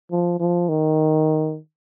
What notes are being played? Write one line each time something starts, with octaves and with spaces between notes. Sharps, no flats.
F3
F3
D#3